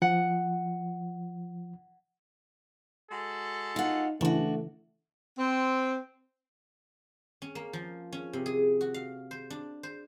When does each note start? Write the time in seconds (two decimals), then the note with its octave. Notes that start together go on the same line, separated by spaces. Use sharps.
0.02 F3 F#5
3.10 G#3 F#4 A4
3.76 D#4 F4 F#5
4.21 C#3 E3 A3 D4 F#4
5.38 C4
7.42 C#4
7.55 A#3
7.73 F3
8.12 C#4
8.33 C3
8.46 G#4
8.81 F#4
8.94 F5
9.31 C5
9.50 D4
9.83 C5